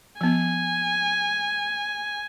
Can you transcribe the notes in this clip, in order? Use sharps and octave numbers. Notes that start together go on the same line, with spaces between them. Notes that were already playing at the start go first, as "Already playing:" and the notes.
F3 B3 G#5